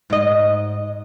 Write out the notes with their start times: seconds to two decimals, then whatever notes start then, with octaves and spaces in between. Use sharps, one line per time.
0.10 G#2 D#5